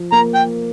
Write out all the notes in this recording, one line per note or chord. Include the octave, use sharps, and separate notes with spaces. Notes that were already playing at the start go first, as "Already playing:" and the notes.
Already playing: F3
A#3 A#5
G5